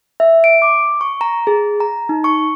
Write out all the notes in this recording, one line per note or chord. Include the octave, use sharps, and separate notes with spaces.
E5
D7
D6
C#6
A#5
G#4
A#5
D#4
C#6